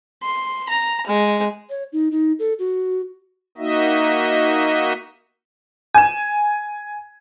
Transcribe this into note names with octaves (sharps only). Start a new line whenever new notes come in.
C6
A#5
G#3
C#5
D#4
D#4
A4
F#4
A#3 D#4 F#4 D#5 E5
G#5 E7